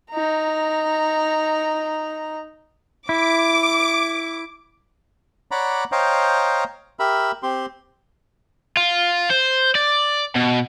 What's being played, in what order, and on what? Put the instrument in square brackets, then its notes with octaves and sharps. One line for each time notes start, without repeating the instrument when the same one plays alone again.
[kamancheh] D#4 A#5
[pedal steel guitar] E4 [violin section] D6
[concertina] C#5 D5 F#5 A#5 B5 D6
C5 C#5 D#5 F5 G5 A#5
G4 A#4 E5 B5
C4 G4 C6
[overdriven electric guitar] F4
C5
D5
B2